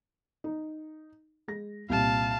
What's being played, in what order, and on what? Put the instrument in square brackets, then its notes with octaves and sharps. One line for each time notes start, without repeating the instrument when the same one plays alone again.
[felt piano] D#4
G#3 A#6
[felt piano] C2 A#2 [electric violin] F5 A5